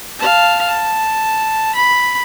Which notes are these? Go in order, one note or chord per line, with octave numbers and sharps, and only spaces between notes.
F5 A5
A5
B5